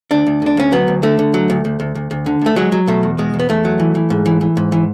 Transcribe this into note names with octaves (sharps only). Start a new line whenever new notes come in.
D2 D4
D2
D3 D4
D2 C#4
F#3 B3
D2
D3 A3
D3
F#3
D2
D2
D2
D2
D2
D3
D2 A3
F#3 G#3
F#3
B2 A3
E2
B2 G#3
E2
B3
E2 A3
F#3
E3
E3
G#2
E3
E3
G#2
E3